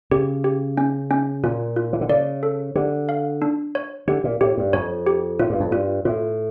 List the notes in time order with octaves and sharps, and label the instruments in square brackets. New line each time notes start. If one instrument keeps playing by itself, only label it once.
[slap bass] C#3 [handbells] G4
[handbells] G4
C#4
C#4
[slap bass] A#2 [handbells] F4
[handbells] F4
[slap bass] E3
D3
[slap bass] C#3 [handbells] D5
[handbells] A4
[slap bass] D3 [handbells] G4
[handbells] F5
D4
C#5
[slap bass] D3 [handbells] G4
[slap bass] A#2
[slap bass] A2 [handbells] G4
[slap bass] G2
[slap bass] F2 [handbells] C#5
[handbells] G4
[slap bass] A2 [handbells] F4
[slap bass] G2
F2
[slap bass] G2 [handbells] F4
[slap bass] A2 [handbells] F4